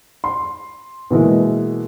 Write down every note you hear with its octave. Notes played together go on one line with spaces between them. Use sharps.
C6
B2 E3 G#3 A#3